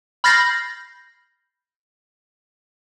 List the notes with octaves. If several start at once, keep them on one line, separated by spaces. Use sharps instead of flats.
B5 F6 G6 A6 A#6 C7